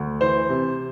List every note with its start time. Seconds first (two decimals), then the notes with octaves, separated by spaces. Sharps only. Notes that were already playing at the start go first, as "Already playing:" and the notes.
Already playing: D2
0.20 E3 C5
0.49 C3